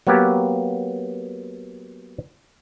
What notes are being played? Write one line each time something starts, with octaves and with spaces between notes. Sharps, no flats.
F#3 A#3 B3 G4